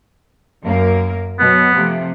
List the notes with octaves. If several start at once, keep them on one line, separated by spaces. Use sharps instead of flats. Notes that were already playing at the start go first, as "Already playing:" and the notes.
F#2 A#3 A#4
B2 F#3 B3
C3 F3 A3